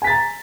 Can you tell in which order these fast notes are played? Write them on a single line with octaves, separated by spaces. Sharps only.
G#5 B6 A6 A#5